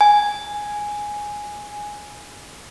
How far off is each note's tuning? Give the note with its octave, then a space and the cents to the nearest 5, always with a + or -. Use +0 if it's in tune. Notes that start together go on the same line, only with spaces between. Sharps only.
G#5 +0